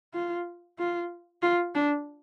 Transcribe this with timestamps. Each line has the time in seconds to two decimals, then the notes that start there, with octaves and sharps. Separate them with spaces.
0.14 F4
0.78 F4
1.42 F4
1.75 D4